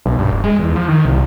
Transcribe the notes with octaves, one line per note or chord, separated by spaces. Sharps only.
B1
G2
D#1
G#3
E2
F3
D#3
C2